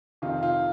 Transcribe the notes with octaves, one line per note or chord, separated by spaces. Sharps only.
F2 C3 D#3 F4
F4